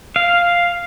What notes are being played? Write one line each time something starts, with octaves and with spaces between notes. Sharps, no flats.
F5